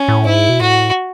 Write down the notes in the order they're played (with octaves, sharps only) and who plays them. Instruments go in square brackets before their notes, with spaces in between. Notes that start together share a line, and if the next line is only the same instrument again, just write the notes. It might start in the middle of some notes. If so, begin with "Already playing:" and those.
Already playing: [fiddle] C#4
[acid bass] A2
[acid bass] G#2 [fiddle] E4
[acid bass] B2
[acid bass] A2 [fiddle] F#4